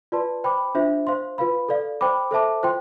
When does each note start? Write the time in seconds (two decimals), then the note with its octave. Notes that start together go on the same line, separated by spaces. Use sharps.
0.12 F4 B4 D5 A5 C6
0.44 C5 G5 B5 D6
0.75 D4 F4 C5 E5
1.07 C5 F5 C6
1.38 F4 B4 F5 B5
1.69 A4 D5 F5
2.01 C5 G5 B5 D6
2.31 A4 C5 E5 A5 D6
2.63 F4 C5 G5 C6